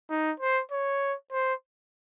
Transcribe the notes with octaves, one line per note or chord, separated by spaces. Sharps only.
D#4
C5
C#5
C5